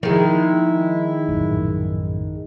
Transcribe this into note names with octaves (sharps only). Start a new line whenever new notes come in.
D#3 F3 G#3 A#3 E4
A#1 F#2 A2